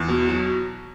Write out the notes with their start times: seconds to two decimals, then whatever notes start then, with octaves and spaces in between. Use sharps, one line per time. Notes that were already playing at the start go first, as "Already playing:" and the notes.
Already playing: E2
0.08 B2
0.29 F#3